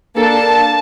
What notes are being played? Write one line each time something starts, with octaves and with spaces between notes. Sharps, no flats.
A#3 D4 A4 A5